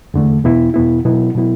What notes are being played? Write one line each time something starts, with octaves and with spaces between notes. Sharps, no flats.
E2 D3 A3
E2 B2 B3 E4
E2 B2 B3 E4
B2 F#3 B3 E4
B2 F#3 B3 E4